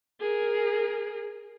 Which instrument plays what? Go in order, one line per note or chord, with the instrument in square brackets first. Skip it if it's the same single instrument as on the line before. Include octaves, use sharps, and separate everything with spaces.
[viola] G#4 A#4